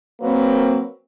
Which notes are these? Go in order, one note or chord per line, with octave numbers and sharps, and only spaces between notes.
F#3 A#3 C4 A#4 B4